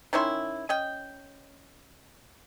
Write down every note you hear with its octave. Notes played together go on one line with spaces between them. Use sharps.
D#3 C#4 E4 C6
C#4 D#5 G5